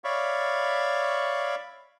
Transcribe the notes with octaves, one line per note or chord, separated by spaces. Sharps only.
C#5 D5 E5 F5 B5 C#6